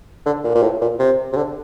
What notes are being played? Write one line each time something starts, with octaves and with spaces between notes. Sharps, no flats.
D3
A#2
A#2
A2
A#2
C3
C3
D3